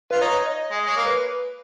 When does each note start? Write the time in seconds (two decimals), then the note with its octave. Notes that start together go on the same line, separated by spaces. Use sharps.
0.11 F4 B4
0.21 D#4 C#5
0.47 D#5
0.72 G#3
0.79 D#5
0.86 G#3 C#5
0.97 A#3
1.05 B4